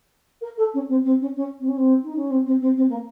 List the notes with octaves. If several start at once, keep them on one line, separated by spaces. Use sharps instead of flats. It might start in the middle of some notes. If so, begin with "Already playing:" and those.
A#4
A4
C#4
C4
C4
C#4
C#4
C4
C#4
C4
D#4
C#4
C4
C4
C4
C4
A#3